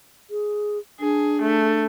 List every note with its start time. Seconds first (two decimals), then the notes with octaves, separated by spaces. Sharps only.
0.30 G#4
1.00 D4 G#4
1.42 A3